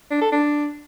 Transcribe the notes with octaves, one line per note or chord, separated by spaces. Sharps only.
D4
A4
D4